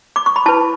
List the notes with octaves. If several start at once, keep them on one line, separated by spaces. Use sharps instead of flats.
D6
C#6
B5
E4 B4 A5